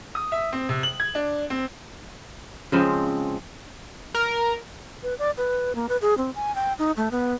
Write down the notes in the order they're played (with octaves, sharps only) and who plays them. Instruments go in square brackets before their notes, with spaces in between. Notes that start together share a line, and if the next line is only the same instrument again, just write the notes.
[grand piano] D#6
E5
C4
C3
F#7
G#6
D4
C4
[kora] C#3 F3 G#3 C4
[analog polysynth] A#4
[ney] B4
D5
B4
A#3
B4
G#4
C4
G#5
G5
D#4
A3
B3